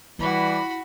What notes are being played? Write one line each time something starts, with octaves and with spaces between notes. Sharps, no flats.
E3 G3 E4 F#4 B5